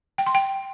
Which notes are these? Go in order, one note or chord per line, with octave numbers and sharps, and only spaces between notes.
G5
C6
G5